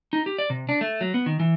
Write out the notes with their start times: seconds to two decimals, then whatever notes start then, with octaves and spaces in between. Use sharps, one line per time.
0.13 D#4
0.26 G4
0.38 D5
0.50 C3
0.69 D4
0.81 A3
1.01 F#3
1.14 B3
1.26 D#3
1.40 E3